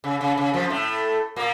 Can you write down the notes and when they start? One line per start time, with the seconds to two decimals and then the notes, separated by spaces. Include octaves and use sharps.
0.04 C#3
0.21 C#3
0.38 C#3
0.54 F2 F3
0.70 A2 A3
1.36 A#2 A#3